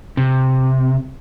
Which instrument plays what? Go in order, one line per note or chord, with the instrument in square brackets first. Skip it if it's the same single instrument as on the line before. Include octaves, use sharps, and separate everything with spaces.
[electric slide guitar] C3